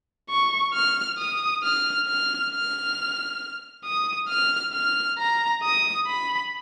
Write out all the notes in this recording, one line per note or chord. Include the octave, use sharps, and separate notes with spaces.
C#6
F6
D#6
F6
F6
F6
D#6
F6
F6
A#5
D#6
B5